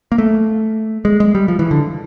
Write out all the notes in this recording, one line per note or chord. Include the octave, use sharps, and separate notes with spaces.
A#3
A3
G#3
G#3
G3
F3
E3
D3